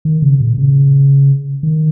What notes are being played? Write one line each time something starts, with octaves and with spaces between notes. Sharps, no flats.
D#3
C#3
A#2
C#3
D#3